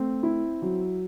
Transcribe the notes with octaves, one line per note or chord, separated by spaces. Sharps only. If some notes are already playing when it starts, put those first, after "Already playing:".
Already playing: A3 C4
E4
F#3